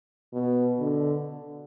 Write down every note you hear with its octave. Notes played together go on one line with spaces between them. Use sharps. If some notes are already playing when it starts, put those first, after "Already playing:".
B2
D3